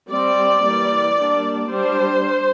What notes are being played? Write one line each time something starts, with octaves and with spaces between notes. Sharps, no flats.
G3 C4 D5
E3 G3 A#3
G3 A#3 D4
G3 D4 C5